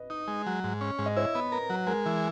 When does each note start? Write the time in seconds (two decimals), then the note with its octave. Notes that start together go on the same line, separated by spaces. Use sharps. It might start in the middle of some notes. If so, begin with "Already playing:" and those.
Already playing: B4 D#5
0.10 D#4
0.28 G#3
0.46 F#3
0.64 G#2
0.81 C#4
0.98 G#2
1.06 D#5
1.16 E4 C#5
1.35 B3
1.52 A#4 B4
1.70 F#3
1.87 G#3 A#4
2.06 E3